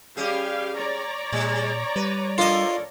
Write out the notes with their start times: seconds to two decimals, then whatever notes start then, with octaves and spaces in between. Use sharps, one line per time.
0.17 G3 C#4 G4 G#4 F5
0.76 C#5 D5 A#5
1.33 A#2 G3 G#3
1.96 G3 B4
2.38 D4 F4 A4 A#4 D#5